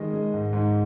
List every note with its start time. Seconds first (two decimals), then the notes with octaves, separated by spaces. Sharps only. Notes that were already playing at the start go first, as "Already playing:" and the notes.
Already playing: D#3 G#3 D#5
0.13 G#3
0.34 G#2
0.53 G#2